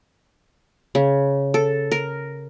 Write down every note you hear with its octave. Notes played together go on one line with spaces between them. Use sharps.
C#3
A4
A#4